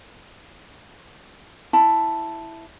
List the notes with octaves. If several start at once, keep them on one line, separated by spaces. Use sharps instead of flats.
E4 A5